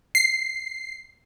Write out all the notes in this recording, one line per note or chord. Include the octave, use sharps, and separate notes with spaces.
C7